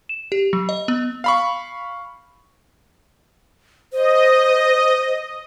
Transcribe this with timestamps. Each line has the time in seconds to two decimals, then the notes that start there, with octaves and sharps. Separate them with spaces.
0.09 E7
0.32 G4
0.53 F#3
0.69 D#5
0.88 B3
1.24 F5 B5 C#6
3.93 C5 D#5